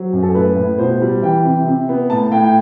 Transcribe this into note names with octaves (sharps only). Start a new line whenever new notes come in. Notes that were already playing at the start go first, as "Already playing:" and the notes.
Already playing: F#3 C5
F#2
A4
A2 B4
A2
B2 C5
G3
E3 G5
C3
C3
B3
A2 A5
A2 G5
G5